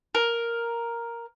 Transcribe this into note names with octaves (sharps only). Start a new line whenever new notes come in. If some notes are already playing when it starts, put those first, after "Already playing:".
A#4